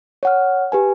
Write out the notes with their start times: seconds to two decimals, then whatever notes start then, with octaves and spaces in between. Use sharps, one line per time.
0.23 C#5 F#5 F6
0.72 G4 B4 G#5